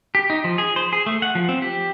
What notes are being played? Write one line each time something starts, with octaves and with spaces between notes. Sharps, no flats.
G4
D#4
F3
G#4
C5
G#4
A3
F#5
F3
C4
G4